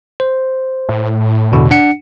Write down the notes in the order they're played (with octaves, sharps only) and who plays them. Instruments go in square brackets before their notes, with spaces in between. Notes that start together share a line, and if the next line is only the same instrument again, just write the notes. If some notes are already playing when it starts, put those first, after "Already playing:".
[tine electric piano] C5
[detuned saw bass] A2
[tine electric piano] E2 B2 D3
D4 F#5 C#7